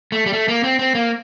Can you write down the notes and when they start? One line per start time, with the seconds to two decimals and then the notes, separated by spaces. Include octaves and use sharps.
0.12 A3
0.26 G3
0.33 A3
0.48 A#3
0.64 C4
0.79 C4
0.95 A#3